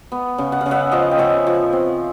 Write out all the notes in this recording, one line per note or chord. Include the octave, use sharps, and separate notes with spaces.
B3
C#3
F#5
F5
C#3
E5 F#5
F3 D#5 F5
G5
C#3 E5 F#5
F3
C4